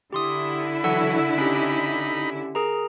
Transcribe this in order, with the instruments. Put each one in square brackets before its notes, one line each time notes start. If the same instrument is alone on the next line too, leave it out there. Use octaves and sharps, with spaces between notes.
[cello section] D3 E4 [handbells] G4 C6 D#6
[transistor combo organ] E3 F#3 [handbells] A4 F#5 E6
[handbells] C#4 G4 [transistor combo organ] D#4 B5
[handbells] G#4 A#4 A#5